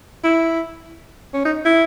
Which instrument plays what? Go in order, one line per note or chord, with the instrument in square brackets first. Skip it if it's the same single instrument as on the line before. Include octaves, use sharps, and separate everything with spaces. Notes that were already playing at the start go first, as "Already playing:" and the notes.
[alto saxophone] E4
C#4
D#4
E4